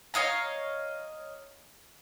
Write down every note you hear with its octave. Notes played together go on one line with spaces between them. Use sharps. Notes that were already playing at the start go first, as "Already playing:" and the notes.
C#5 D#5 F5 A#5